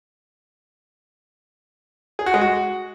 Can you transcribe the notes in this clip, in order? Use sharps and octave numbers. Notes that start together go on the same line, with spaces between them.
G#4
F#4
G#3
F#4